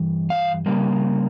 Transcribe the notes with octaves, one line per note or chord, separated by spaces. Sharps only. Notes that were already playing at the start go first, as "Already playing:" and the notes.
Already playing: G2 E3
F5
C#3 G3 A#3